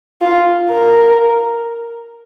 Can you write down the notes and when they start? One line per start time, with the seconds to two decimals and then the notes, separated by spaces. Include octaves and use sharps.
0.21 F4
0.70 A#4